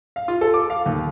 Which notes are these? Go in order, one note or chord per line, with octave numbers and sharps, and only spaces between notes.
F5
F4
A4
D6
F5
D#2